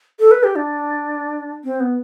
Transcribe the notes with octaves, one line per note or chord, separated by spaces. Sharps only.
A4
B4
G4
D4
C4
B3